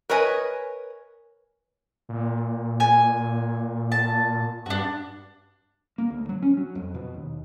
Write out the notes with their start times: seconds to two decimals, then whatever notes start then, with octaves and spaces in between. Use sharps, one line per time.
0.09 A#4 B4 C#5 D#5 G#5
2.09 A#2
2.80 G#5
3.92 A5
4.66 G2 D4 F#4
5.98 A#3
6.10 D2
6.29 F#3
6.42 C#4
6.57 F#3
6.75 F2
6.94 B2
7.14 D#2